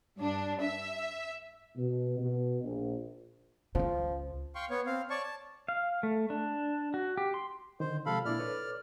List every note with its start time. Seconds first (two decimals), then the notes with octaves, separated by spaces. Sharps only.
0.19 G2 D4
0.61 E5
1.76 B2
2.18 B2
2.64 A#1
3.75 C#2 C#3 F3
4.55 F5 G5 C6 C#6
4.70 B3 C#5
4.86 C4 F5
5.10 C#5 D5 A5 C#6
5.23 A5
5.68 F5
6.03 A3
6.30 D4
6.94 F#4
7.17 G4
7.34 C6
7.80 D3 D#3 C5
8.06 C3 F3 G#3 A4 F5 B5
8.25 A#2 D4 E4 D5 F6
8.39 A4 B4 C#5